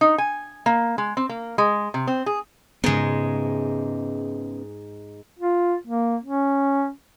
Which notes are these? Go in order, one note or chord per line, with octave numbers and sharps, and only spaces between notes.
D#4
G#5
A#3
G#3
C4
A#3
G#3
C3
C4
G#4
G#2 C#3 G#3 B3
F4
A#3
C#4